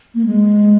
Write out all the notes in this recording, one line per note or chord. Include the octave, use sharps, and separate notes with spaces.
A#3
G#3